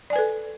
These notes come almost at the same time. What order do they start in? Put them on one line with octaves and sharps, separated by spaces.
D5 G#5 B4 A4